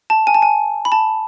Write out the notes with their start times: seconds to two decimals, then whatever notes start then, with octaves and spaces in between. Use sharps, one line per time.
0.10 A5
0.27 G#5
0.34 A5
0.42 G#5
0.85 B5
0.92 A5